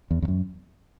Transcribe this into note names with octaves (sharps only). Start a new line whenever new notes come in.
E2
E2
F#2